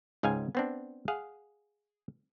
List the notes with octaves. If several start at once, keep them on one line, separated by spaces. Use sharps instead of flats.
C#2 G#2 D#5 F5 G5 G#5
B3 C4 D4
G#4 F5 F#5